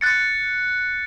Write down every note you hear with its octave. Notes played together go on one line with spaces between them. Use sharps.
F#6 A6 C#7